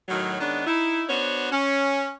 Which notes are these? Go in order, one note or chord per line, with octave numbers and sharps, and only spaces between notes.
A2 D#3 F#3
D#3 G#3 B3 C#4 D4
D#4 E4
B3 D4 F#4 C5 C#5
C#4